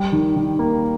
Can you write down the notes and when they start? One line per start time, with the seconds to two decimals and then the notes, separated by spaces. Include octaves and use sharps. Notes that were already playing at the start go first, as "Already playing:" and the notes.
Already playing: G3
0.12 D#3
0.36 D#3
0.59 A#3